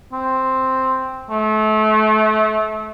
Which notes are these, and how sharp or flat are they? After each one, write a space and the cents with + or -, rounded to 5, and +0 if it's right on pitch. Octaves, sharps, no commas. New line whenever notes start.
C4 +0
A3 -30